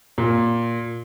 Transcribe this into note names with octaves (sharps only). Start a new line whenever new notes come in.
A#2